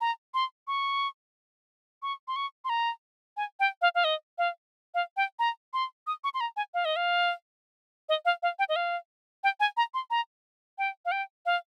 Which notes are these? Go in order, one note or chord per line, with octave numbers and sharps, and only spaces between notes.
A#5
C6
C#6
C#6
C6
C#6
C6
A#5
G#5
G5
F5
F5
D#5
F5
F5
G5
A#5
C6
D#6
C#6
C6
A#5
G#5
F5
D#5
F5
D#5
F5
F5
G5
D#5
F5
G5
G#5
A#5
C6
A#5
G5
F5
G5
F5